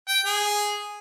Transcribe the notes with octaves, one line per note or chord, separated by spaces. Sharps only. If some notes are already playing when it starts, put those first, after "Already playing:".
G5
G#4